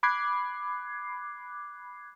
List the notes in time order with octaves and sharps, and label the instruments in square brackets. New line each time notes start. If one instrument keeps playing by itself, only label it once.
[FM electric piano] B5 D6 F#6 G#6 C7